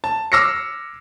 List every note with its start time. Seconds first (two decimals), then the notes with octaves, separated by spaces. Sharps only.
0.04 A5
0.32 D6 E6 F6 A#6 C7 C#7